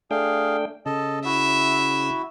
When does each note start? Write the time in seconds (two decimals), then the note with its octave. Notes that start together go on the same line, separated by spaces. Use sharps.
0.11 A3 D4 G#4 F5 G5
0.86 C#3 A4 D#5 A5
1.25 E4 F#4 E5